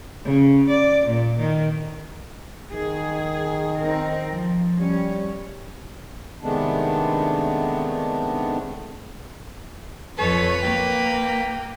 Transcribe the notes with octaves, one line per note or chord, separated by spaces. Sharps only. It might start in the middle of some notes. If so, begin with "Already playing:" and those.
C#3
D5
A#2
D#3
D#3 G#4
C4 D#4 A#4
F3
G3 C#4
C3 D#3 G#3 A3 B3 D4
F2 A4 B4 C#5
A#3 G5